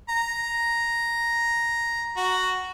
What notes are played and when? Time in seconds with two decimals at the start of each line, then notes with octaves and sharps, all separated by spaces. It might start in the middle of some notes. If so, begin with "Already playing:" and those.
0.09 A#5
2.17 F#4